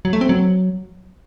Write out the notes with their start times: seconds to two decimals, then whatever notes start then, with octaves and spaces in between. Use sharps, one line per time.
0.05 F#3
0.13 A3
0.21 C4
0.29 F#3